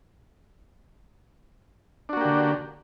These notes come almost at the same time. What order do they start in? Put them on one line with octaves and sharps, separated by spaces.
D4 F#4 A#3 G4 D3